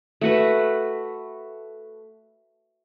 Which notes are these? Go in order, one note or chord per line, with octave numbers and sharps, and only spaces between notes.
A3 F#4 B4